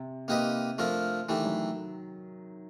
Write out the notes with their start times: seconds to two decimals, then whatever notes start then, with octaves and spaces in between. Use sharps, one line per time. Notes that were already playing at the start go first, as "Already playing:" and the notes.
Already playing: C3
0.28 C3 A#3 D#4 G4 B4 D#5
0.78 F3 A3 D4 F4 A#4
1.29 D#3 E3 A3 D4 G4
1.45 F#3